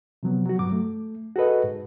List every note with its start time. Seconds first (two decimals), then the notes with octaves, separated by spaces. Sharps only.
0.23 C3 F3 F#3 B3
0.46 F#3 F#4
0.59 G2 F#3 D6
0.72 A3
1.36 F#4 G#4 A4 B4 D#5
1.64 G#2